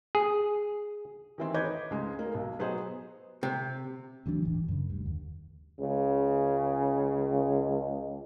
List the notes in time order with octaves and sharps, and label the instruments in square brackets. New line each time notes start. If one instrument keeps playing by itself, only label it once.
[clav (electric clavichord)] G#4
[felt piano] D#3 E3 C4
B4 C#5 D#5 D6 G6 G#6
C#2 G#3
A#3
B1
F#3 B3 G#4 C5 D#5
[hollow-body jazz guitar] C3
[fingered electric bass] D2 E3 F#3 D4
D#1 G#1 E3
F#2 C#3
D2 G2
D#2
[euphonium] C#2 [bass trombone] C#3